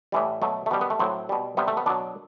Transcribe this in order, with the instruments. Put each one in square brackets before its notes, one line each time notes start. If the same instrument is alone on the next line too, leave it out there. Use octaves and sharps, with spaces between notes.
[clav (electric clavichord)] A2 E3 G3
B2 F#3 A3
A3
B2 G3 B3
B3
A3
A2 F#3 C4
B2 G3
C3 G3 B3
A3
B3
B2 F#3 D4